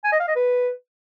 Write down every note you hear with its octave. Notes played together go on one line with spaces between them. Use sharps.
G#5
D#5
F5
D#5
B4